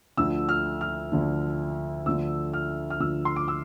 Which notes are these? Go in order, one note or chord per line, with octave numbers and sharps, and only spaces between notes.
D2 D3 F3 E6
F6
F6
D2 D3 F3
D2 D3 F3 E6
F6
F6
D2 D3 F3 E6
C6
D6
E6